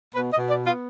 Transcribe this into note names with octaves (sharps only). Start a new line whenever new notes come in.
B2 B4
D#5
B2
D5
B3
F4